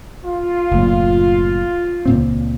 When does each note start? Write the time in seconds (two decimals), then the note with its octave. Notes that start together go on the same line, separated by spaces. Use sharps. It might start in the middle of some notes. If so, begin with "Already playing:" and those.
0.24 F4
0.71 F#1 A2 A#3
2.06 C#2 A#2 C4